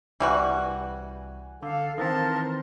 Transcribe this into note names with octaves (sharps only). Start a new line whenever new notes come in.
C2 E3 G3 F#4 G#5 F#6
D3 A4 F5
D#3 E3 C4 A#4 C5 A5